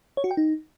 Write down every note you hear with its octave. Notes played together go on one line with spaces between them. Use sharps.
C#5
F#4
G5
D#4